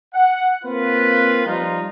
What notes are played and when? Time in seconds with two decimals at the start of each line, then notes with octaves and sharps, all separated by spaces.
0.14 F#5
0.64 A#3 C4 F4 B4
1.46 F3 G3 D#4 F4